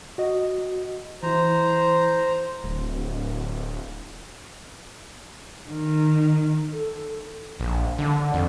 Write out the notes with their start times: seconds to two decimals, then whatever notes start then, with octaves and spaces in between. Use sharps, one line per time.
0.18 F#4 D#5
1.23 E3 E4 C5 A#5
2.64 D1
5.70 D#3
6.73 A4
7.60 A#1
7.98 D3
8.34 F2